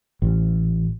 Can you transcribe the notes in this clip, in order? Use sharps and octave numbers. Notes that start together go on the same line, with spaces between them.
A1